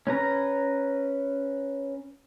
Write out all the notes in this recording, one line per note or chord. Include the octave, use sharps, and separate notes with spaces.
C#4 B4 A#5